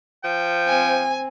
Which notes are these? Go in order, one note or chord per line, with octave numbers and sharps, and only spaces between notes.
F3 G5
C4 G#5